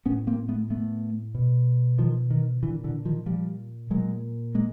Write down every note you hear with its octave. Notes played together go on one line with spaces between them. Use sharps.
A2 B3 C#4
A#3 C4
A3 B3
A3 B3
B2
D#3 F3
D#3
A#2 D3 E3
D3 E3
D#3 F3
F3 G3
A#2 F#3 G#3
G#3 A#3